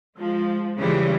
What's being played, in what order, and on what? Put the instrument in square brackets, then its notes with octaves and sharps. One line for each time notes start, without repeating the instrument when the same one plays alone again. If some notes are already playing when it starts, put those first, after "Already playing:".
[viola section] F3 [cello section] G#3
[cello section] C#3 E3 C#4 [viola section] G3 G#3